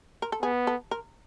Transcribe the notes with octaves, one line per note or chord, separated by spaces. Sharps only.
A#4
A4
B3 G#4
A4
A#4